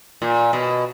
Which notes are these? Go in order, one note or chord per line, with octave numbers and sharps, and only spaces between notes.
A#2
B2